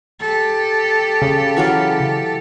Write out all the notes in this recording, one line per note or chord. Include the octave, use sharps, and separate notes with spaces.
G4 A4
C#3
E3 F#3 F5